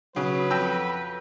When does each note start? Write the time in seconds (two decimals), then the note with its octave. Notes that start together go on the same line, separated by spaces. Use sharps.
0.16 C#3 F#3 B4
0.50 F2 G5 E6